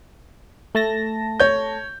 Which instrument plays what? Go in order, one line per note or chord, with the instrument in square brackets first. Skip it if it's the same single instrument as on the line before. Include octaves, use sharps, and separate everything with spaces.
[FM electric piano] A3 A5 A#6
[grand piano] C#5 G6